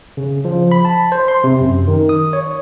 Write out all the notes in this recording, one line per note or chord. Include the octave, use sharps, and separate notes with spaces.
C#3
F3
B5
A5
C5
C6
C3
F#2
D#3
D#6
C#5